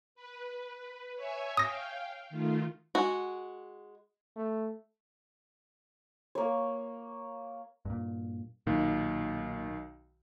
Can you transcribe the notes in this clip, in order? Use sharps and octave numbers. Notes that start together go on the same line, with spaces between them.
B4
C#5 E5 G#5
F5 G5 D#6 A#6
D#3 A3 F4
G#3 F#4
A3
A#3 C#5
G2 A#2
B1 A#2 D#3